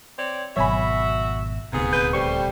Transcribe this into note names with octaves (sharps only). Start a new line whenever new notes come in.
C4 C#5 D5
G#1 B2 F#3 F#4 C#5 E5 G#5 B5
D#1 D2 G#2 C3 B3 G#4
B4 G6
G3 A3 G4 C5 C#6